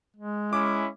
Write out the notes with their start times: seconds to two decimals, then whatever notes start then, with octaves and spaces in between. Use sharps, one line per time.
0.16 G#3
0.53 C#4 E4 D6